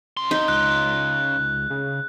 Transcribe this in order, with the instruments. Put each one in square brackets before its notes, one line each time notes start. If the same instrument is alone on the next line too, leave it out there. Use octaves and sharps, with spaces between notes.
[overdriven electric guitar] C#3 C6
[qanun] D#4
[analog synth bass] C#2 [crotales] F#6
[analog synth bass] C#3